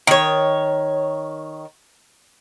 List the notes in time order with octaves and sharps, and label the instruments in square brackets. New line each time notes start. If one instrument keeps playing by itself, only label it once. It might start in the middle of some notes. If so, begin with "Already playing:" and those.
[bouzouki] D#3 C#5